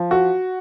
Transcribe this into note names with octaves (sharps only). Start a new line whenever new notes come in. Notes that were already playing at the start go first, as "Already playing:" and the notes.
Already playing: F3
F#4